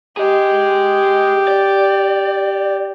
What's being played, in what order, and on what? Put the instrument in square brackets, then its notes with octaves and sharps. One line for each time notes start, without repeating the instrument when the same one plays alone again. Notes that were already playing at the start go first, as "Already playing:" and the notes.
[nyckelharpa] G4 [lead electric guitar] G#4 D#5
[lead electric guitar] D5